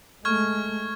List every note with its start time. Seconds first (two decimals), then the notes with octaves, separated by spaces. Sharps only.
0.25 G#3 A3 C#6 F6 G#6